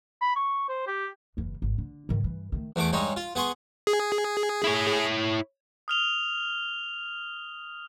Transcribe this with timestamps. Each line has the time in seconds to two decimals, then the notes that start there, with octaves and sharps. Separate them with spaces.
0.21 B5
0.36 C#6
0.69 C5
0.87 G4
1.37 F#1 E2
1.62 G#1
1.78 D3
2.09 G#2 D#3
2.24 G2 E3
2.52 D#3 A3
2.76 E2 E3 A3 D6
2.93 G2 G#3 D#4 C#5
3.17 F4
3.35 B3 G#4 C6 C#6
3.87 G#4
4.64 E4 C#5
5.88 D#6 F6 F7 G7